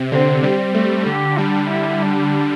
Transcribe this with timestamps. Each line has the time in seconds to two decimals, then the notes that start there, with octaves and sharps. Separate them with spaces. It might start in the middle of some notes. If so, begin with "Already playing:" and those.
Already playing: C3
0.12 D3 C4
0.43 G3 C4
0.74 A3
1.06 D3 G4
1.38 G3 D4
1.71 E4
2.03 D4